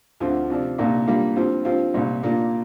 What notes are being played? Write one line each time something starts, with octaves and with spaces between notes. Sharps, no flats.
D2 D3 F3 C4 F4
C3 F3 D4
C2 A#2 A#3 D4
G2 G3 A#3 F4
G2 F3 C4 F4
G2 F3 C4 F4
C2 A#2 G3
A#2 A#3 D4 F4